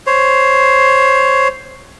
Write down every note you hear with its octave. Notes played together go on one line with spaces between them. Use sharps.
C5 C#5